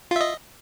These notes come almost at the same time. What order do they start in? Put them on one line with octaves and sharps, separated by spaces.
F4 E5 D#5